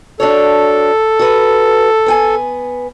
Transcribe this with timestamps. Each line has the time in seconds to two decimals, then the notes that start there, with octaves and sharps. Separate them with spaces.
0.20 D4 F#4 A4 C#5
1.19 F#4 B4
2.06 B3 G5 G#5